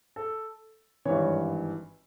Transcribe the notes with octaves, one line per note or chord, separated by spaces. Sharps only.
A4
G#1 G2 E3 C#5